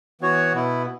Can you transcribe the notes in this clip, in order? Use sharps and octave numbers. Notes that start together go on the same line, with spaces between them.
E3 B3 F#4 C#5
B2 B3 E4